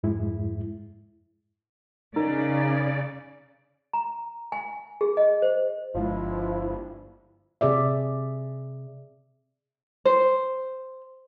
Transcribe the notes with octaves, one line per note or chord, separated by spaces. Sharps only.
F2 G#2 G#3 E4
C#3 D#4 A#4 D5
A#5
G#5
G#4
D#5
C5
G1 F3 G#3 E4
C3 G#4 D5 E5
C5